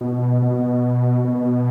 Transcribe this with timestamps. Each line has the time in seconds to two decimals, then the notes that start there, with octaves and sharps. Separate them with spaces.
0.01 B2
0.42 B2
1.25 B2